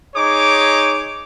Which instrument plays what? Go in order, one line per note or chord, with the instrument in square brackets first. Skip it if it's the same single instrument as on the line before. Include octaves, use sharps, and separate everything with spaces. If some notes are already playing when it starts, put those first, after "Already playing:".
[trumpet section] D#4 G#4 C#5 D6